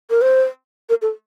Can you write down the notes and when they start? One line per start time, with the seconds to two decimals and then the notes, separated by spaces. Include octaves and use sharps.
0.10 A#4
0.22 C5
0.89 A#4
1.02 A4